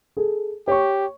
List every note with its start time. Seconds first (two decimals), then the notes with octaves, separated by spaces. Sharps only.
0.17 G#4 A4
0.68 G4 C#5 C#6